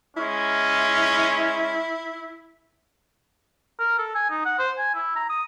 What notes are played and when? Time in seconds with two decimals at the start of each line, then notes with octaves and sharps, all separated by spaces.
0.17 G#3 C#4 E4
3.80 A#4
3.98 A4
4.15 G#5
4.30 D#4
4.45 F#5
4.59 C5
4.78 G#5
4.94 E4
5.16 A#5
5.29 D#6